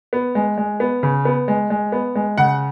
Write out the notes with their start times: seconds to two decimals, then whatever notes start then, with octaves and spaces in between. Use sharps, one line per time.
0.13 B3
0.35 G#3
0.58 G#3
0.80 B3
1.03 C#3
1.25 B3
1.48 G#3
1.70 G#3
1.92 B3
2.16 G#3
2.38 C#3 F#5